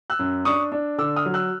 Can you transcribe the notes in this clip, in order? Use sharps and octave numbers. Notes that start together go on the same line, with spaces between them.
E6 F#6
F#2
D4 C#6 D#6
D4
D3 D6 E6
D#6 F6
F#3
E6 F#6